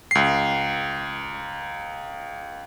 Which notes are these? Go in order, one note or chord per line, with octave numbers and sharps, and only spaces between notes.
C#2 C7